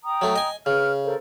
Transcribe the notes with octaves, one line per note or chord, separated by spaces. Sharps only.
G5 A#5 D#6
F#3 A3
D#5 G#5
C#3 B4 F6
A4 A#4 C5